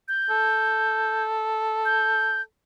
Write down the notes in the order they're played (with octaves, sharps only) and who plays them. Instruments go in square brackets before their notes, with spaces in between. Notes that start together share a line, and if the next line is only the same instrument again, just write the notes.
[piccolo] G6
[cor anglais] A4
[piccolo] G6